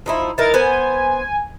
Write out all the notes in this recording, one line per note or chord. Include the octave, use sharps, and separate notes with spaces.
F3 D#4 E4
E3 D#4 A#4 A6
B3 C5 G#5